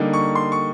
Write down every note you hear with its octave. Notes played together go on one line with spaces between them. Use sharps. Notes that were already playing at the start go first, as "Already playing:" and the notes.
Already playing: D3 G3 A#3 D#4
C#6
C6
C#6